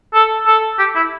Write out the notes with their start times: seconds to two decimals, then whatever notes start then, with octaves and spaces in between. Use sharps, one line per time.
0.14 A4
0.47 A4
0.79 G4
0.96 E4